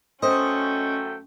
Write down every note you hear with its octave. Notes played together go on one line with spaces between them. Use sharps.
F#2 A3 C#4 C5 D#5 G5